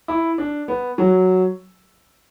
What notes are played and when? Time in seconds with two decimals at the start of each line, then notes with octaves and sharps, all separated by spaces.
0.08 E4
0.38 D4
0.68 B3
0.98 F#3